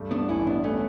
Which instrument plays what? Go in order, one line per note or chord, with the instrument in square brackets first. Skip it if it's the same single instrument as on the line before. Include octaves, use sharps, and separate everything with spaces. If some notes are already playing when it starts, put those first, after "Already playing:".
Already playing: [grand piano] G2 A3
[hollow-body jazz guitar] B3 D4
[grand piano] A1 [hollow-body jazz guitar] C#4 E4
[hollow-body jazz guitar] B3 D4
[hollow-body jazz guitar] A3 C#4 [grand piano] B3